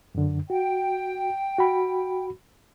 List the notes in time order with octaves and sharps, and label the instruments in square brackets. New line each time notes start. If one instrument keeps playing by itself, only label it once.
[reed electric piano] F#2 D3
[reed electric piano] F#4 [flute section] G5
[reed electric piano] F#4 B5